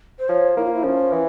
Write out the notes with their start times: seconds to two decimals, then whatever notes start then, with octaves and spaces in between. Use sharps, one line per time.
0.19 C5
0.29 F3 C#5
0.57 A#3 E4
0.65 F4
0.74 E4
0.84 F3 C#4
1.12 E3